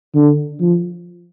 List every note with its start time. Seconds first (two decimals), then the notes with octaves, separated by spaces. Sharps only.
0.15 D3
0.60 F3